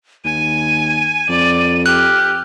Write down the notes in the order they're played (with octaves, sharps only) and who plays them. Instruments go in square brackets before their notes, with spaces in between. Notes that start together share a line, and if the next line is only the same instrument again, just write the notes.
[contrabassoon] D#2 [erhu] G#5 [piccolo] D#7
[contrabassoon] F2 [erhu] D5
[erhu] G4 [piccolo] F6 [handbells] F#6